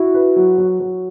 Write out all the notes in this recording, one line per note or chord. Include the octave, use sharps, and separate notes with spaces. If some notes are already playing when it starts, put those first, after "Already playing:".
Already playing: E4 F#4
B4
F#3
F#3
F#3